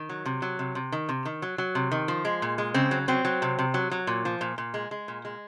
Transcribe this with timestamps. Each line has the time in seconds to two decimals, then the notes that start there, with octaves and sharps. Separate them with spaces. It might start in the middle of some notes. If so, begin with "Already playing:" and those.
Already playing: D#3
0.09 F#3
0.26 C3
0.42 F#3
0.59 C3
0.75 C3
0.92 D#3
1.09 C3
1.25 D#3
1.42 F#3
1.58 F#3
1.75 C3
1.91 D#3
2.08 F3
2.25 G#3
2.42 A#2
2.58 G#3
2.74 C#3 C4
2.91 F#3
3.08 F#3 C4
3.25 F#3
3.42 C3
3.59 C3
3.74 F#3
3.91 F#3
4.07 A#2
4.25 F3
4.41 A#2
4.58 A#2
4.74 G#3
4.91 G#3
5.08 A#2
5.25 G#3